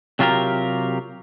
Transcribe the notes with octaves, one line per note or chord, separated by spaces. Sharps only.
C3 F#3 F4 G4 A#4